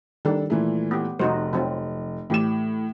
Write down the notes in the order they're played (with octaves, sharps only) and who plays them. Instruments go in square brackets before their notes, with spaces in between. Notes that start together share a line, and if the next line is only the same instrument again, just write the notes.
[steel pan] D#3 G3 [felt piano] D4 A4
[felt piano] A#2 E3 A3
[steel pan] B3 G4
[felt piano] F1 [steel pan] D#4 F#4 C5
[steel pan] F3 F#3 C4
[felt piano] A2 E7 [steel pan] E3 G4